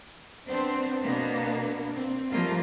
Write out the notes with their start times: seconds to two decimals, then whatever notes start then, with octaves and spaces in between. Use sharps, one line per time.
0.48 B3 C4 D4 C5
1.01 B2 A#3 B3 D4
1.93 C4
2.31 F3 G3 A3 A#3 F4